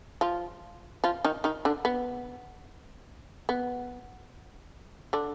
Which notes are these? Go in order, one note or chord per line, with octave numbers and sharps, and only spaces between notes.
F3 F4
F3 F4
D#3 D#4
D#3 D#4
D3 D4
B3
B3
D3 D4